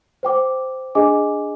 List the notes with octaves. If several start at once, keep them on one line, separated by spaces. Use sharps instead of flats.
C5 G5 D6
D4 G#4 D#5 G#5 D6